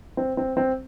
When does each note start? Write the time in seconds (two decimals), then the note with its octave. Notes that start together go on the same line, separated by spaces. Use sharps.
0.17 C4
0.37 C4
0.57 C4